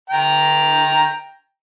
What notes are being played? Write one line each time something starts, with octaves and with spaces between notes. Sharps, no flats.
G5 A#5